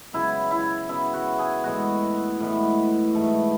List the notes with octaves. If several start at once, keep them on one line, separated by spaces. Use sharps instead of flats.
C#3 F#3 B3 E4
E4
C#3 F#3 B3 E4
F#4
G#4
A2 E3 G#3 B3 F#4
A2 E3 G#3 B3
G#2 E3 A3